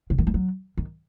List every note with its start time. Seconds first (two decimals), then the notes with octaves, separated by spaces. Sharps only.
0.10 C#3
0.18 D#3
0.27 E3
0.34 F#3
0.77 D#3